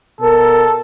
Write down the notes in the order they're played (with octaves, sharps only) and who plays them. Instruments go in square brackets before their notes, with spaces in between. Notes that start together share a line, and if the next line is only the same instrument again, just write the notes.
[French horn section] B2 A#4 [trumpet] A4